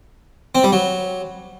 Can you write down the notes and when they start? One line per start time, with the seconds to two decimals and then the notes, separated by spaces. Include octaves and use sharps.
0.55 C4
0.63 G3
0.72 F#3